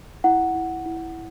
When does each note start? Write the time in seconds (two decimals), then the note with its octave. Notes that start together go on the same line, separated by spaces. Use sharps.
0.24 E4 F#5
0.55 E4
0.86 E4